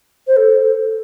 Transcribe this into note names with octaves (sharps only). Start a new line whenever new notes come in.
C5
A4